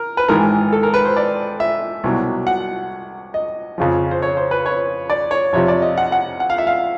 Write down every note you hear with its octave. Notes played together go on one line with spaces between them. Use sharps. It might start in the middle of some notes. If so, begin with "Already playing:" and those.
Already playing: A#4
B4
G#1 G#2 E3 A#4
A4
A#4
B4
C5
D5
E5
C2 B2 F#3
F#5
D#5
F2 C#3 F3
C5
C#5
C5
B4
C#5
D5
C#5
F2 C3 F3 C#5
D5
D#5
F#5
F#5
F#5
F5
E5
F5